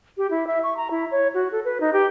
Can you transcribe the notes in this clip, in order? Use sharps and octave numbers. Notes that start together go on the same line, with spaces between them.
G4
E4
E5
C#6
A#5
E4
C#5
F#4
A4
B4
D#4
G4